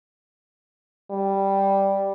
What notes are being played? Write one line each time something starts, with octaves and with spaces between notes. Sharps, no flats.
G3